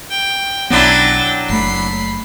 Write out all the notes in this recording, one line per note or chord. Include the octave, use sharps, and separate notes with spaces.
G5
B1 F#3 B3 D4 E4 G5 A6
F#1 A3 B5 C7